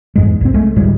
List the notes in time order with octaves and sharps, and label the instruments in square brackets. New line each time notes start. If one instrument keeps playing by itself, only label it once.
[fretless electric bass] E2 G#2 G#3
C2 C4
G#3 A3
D2 A2 G3 G#3